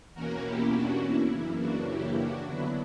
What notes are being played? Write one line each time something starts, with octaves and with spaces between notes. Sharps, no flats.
E2 B2 A#3 C#4 F#4 A#4
E4 G4
D4 F#4
E4
F#2 C#3 E3 A#3
D4 F#4
E4 G4
D4 F#4
D3 F#3 B3 D4 E4